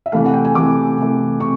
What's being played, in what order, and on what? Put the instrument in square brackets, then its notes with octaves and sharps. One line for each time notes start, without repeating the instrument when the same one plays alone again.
[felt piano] E5
C3 E3 A3 F5
F#5
G5
G#5
C3 E3 A3 D6
C3 E3 A3
C3 C#6